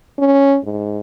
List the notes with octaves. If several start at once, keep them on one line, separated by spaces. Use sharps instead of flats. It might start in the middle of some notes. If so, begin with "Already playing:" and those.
C#4
G#2